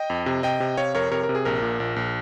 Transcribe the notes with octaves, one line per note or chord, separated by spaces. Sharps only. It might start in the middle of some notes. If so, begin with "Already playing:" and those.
Already playing: D#5 G5
F2
C3
C3 D#5 G5
C3
C3 C#5 F5
F2 A#4 C#5
C3 A#4 C#5
A#4
C3
G#4
A#1 A#4
A#2
A#1
A#1